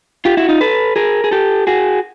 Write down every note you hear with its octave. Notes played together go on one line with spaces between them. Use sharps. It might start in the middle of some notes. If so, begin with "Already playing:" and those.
F4 G4
E4 F#4
D#4 F4
A4 B4
G#4 A#4
G#4
G4 A4
F#4 G#4